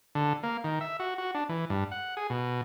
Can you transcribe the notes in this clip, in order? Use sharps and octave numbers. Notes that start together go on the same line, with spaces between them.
D3
A#3
D#3
E5
F#4
F#4
D4
E3
G2
F#5
G#4
B2